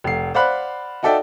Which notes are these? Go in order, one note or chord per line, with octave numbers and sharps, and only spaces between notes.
F1 C7
C5 D5 F5 F#5 B5 F#6
D#4 F#4 A4 D5 E5 G5